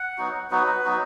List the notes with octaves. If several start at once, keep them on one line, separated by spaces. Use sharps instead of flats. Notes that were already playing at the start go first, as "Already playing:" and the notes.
Already playing: F#5
F#3 B3 D#4 F#4
F#3 B3 D#4 F#4 B4
F#3 B3 D#4 F#4